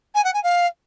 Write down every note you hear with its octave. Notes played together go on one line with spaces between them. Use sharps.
G#5
F#5
G#5
F5